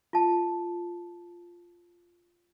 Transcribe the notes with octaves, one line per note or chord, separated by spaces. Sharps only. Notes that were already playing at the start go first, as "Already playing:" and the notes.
F4 A5